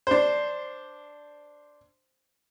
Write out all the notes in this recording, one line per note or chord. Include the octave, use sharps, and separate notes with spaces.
D4 C5